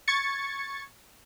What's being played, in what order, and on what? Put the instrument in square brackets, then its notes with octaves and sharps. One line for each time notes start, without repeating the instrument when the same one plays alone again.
[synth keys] C#6 G#6 A6 C#7